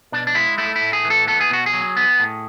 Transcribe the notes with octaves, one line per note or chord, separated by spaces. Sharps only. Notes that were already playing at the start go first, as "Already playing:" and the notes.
B2 D4
D4
G#3 E4
A3 E4
E4
A2
G#4
E3
A4
B3 A4
G#4
B2 F#4
G#4
F#3
B3
A2